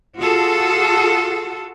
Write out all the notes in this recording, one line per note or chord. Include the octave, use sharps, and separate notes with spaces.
F4 F#4 G#4 A4